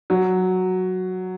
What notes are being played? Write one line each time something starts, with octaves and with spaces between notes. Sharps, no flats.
F#3